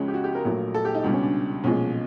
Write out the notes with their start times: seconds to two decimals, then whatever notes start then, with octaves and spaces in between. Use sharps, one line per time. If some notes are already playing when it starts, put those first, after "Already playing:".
Already playing: C#2 C#3 F3 G#3 C#4
0.08 G4
0.14 F#4
0.24 G4
0.35 A#4
0.45 A#1 A#2 F#3 A3
0.74 A4
0.85 G4
0.94 D#4
1.04 C#2 B2 G3 D4
1.13 C#4
1.23 D4
1.64 B1 A#2 F3 G#3 C#4